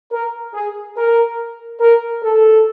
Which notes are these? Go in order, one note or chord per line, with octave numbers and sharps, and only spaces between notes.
A#4
G#4
A#4
A#4
A4